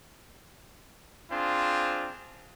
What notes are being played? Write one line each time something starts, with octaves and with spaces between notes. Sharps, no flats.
C4 D4 F4 G#4 C5